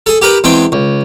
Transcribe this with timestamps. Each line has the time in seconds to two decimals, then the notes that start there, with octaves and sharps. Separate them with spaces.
0.06 G#4 A4
0.22 G4 A#4 B4
0.44 E2 G#3 C4 G5
0.72 C#2